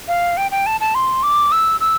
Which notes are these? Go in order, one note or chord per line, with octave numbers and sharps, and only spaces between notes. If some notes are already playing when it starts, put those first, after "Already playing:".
F5
G5
G5
A5
A5
C6
D6
E6
E6